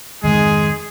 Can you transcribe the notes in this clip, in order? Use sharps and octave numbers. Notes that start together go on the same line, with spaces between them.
F2 G#2 D#3 G#3 G#4